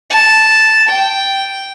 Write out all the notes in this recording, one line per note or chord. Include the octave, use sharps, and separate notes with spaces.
A5
G5